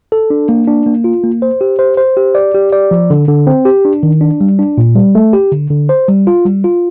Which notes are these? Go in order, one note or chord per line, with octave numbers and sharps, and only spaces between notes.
A4
D4
A#3
D4
A#3
F4
A#3
C5
G4
C5
C5
G4
D5
G4
D5
F3
D3
D3
C4
G4
D4
D#3
D4
G3
D4
A#2
G3
A3
G4
D3
D3
C5
G3
F4
G3
F4